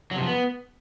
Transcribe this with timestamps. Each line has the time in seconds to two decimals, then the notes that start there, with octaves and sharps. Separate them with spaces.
0.11 F#3
0.16 C3
0.21 F3
0.26 B3